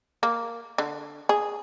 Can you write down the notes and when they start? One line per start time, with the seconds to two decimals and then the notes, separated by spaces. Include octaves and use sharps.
0.23 A#3
0.78 D3
1.29 G#4